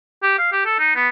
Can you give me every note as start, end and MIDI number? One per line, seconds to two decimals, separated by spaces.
0.23 0.38 67
0.38 0.51 77
0.52 0.63 67
0.65 0.76 69
0.79 0.94 63
0.95 1.08 59